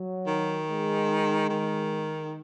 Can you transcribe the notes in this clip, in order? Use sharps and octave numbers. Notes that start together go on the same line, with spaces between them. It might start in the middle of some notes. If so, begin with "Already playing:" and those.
Already playing: F#3
D#3
G#3
D#3